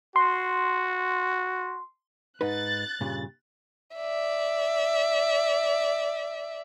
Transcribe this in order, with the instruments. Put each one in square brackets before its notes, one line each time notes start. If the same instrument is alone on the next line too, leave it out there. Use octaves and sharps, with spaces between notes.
[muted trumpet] F#4 [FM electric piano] C6
[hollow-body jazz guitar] G#2 D#4 B4 [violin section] F#6 A6
[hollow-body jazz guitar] G2 A#2 C#3
[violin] D5 E5